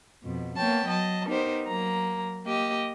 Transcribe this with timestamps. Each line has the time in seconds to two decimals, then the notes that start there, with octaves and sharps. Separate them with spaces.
0.24 F2 B2
0.57 A#3 B3 C#5 G5 A5
0.87 F#3 D#5 A5
1.27 B3 D#4 G4 A#4 C5
1.66 F#3 A#3 A#5
2.44 A#3 G4 D#5